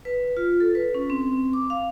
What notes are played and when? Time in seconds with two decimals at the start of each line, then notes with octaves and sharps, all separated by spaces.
0.05 B4
0.37 F4
0.60 A4
0.75 B4
0.94 C#4
1.10 C4
1.53 D6
1.70 F5